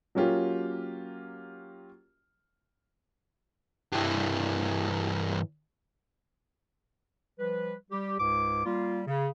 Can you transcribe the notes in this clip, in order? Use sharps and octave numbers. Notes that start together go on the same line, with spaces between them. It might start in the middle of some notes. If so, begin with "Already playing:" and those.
F#3 A#3 C#4 F4 G4
G2 E3
F3 G3 B4
G3 G4
C#2 G#2 D6
G3 A#3 F4
C#3